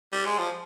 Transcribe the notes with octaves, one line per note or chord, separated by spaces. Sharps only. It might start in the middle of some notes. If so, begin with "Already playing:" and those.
G3
G#3
F3